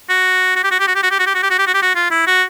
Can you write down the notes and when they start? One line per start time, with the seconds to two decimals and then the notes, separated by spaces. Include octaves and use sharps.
0.09 F#4
0.56 F#4
0.64 G4
0.71 F#4
0.80 G4
0.87 F#4
0.95 G4
1.03 F#4
1.11 G4
1.19 F#4
1.27 G4
1.35 F#4
1.43 G4
1.50 F#4
1.59 G4
1.67 F#4
1.74 G4
1.82 F#4
1.95 F4
2.11 E4
2.27 F#4